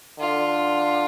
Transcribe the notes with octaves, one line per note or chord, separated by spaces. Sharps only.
D3 F4